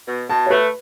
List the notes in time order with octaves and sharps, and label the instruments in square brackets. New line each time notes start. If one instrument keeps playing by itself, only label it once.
[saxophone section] B2
[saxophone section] B2 [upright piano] A5
[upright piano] C#5
[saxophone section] A3 [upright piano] B4